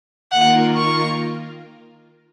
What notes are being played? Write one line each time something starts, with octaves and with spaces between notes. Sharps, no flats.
D#3 A#3 F4 A#4 F#5
C#6